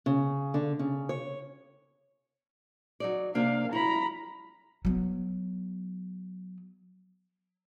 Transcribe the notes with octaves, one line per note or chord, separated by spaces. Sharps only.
C#3
D3
C#3
C#5
F#3 D#4 D5
C3 A#3 D4 F5
E4 A#5 B5
F#3 B3